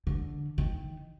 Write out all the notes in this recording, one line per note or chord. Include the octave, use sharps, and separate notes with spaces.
D3
D#3